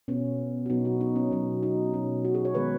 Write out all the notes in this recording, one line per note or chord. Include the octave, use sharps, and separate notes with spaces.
B2 B3 C#4
F#4
B2 F#3 B3 D#4
F#4
D#4
C#4
B2 F#3 C#4
D#4
B2 F#3 C#4
F#4
G#4
C#5
D#3 G#3 B3 B4